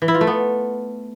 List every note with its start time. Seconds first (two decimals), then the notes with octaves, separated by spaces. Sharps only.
0.02 E3
0.08 E4
0.14 F4
0.21 A3
0.27 B3